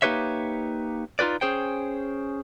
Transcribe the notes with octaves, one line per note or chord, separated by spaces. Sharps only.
A#3 D#4 G4 B4 C#5 E5
D#4 F4 G4 B4 D5
C#4 G#4 C5 G5